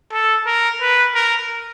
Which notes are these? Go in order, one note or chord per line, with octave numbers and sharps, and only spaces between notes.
A4
A#4
B4
A#4